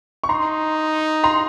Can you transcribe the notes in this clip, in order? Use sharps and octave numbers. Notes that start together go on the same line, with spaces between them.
C#6
D#4 A#5 C6
A#5 C6